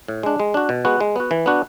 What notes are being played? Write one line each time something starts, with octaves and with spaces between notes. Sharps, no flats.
A2
G#3 D4
G#3
D4 F#4
B2
G#3 B3 F#4
G#3
B3 F#4
E3
B3 D4 F#4